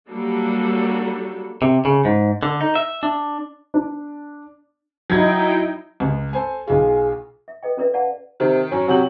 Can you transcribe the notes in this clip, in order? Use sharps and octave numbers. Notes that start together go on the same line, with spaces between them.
F#3 G3 A#3 D4 A4
C3
C#3
G#2
D3
D#4
E5
D4
D4
F#3 D#4 E4 G5 G#6 A#6
C#2
A4 C5 G#5
B1 F4 G#4
E5
A4 B4 D#5 G5
C#4 F4 A#4 B4 D5 E5
D5 F5 F#5 A5
C3 D#3
F#2 C#4
C3 F#3 G4 F#7